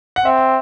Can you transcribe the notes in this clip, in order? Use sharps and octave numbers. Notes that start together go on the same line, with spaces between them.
F#5
C4 E5